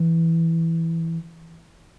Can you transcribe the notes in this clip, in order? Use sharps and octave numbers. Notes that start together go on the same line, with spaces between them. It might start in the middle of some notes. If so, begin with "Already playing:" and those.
Already playing: E3